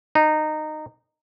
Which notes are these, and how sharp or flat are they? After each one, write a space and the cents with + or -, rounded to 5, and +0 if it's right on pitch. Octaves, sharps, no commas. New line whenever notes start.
D#4 -15